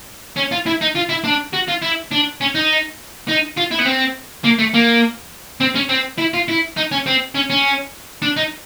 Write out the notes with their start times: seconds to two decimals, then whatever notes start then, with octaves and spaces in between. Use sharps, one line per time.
0.36 C#4
0.51 F4
0.66 E4
0.81 D#4
0.95 F4
1.09 E4
1.24 D4
1.53 F#4
1.68 F4
1.82 E4
2.11 D4
2.41 C#4
2.55 D#4
3.28 D#4
3.57 F4
3.71 E4
3.78 B3
3.85 C4
4.44 A#3
4.58 A3
4.74 A#3
5.60 C4
5.75 C#4
5.89 C4
6.18 E4
6.34 F4
6.48 E4
6.77 D#4
6.92 C#4
7.06 C4
7.35 C#4
7.50 C#4
8.22 D4
8.36 D#4